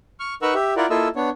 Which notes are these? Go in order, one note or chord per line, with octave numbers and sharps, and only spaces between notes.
C#6 F6
D#4 A#4 B4 F#5 C#6 E6
G4 E5
E4 F4 A#4 D5 F#5
A#3 E4 F4 A4 D#5 E6
B3 D4 C#5